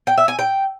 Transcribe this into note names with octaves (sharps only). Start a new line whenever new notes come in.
G5
E5
G#5
G5